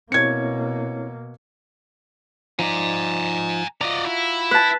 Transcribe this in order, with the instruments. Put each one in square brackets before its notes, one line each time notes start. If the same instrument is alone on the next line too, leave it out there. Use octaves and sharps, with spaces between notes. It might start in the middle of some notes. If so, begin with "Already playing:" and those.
[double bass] B2 A#3 [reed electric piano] C4 E4 C#5 [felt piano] G#6 C#7
[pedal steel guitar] F3 D#4 D5 [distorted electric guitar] G#5 A#5
[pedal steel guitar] F4 F#4 A#5 [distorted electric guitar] D5 D#5
[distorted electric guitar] E4
[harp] B4 A5